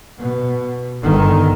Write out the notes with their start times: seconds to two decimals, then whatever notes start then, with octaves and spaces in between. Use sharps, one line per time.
0.18 B2
1.02 G1 D#3